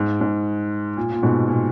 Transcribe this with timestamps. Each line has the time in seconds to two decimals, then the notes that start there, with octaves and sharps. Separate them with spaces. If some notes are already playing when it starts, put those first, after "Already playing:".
Already playing: G#2
0.21 G#2
0.97 A#2
1.12 A#2
1.23 G#2 B2
1.48 A#2